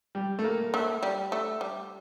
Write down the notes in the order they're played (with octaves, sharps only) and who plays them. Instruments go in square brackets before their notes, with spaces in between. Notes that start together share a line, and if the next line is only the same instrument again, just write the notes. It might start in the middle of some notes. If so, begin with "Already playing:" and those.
[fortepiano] G3
A3
A#3
[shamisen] A3
G3
A3
G3